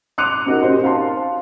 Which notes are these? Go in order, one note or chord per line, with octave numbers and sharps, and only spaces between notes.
C6 D6 F#6 C#7 D#7 F7
C4 D#4 F#4 A#4
C#4 D#4 G4 C5
F5 A5 C6